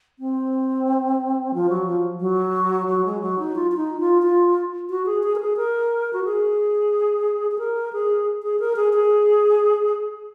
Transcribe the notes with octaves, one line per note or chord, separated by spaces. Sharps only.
C4
F3
F#3
F3
F#3
F#3
G#3
F#3
D#4
F4
F4
D#4
F4
F4
F#4
G#4
G#4
A#4
G#4
A#4
F#4
G#4
G#4
A#4
G#4
G#4
A#4
G#4
G#4